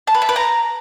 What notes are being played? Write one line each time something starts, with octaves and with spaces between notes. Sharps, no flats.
A5
B4
E5
B4
A#5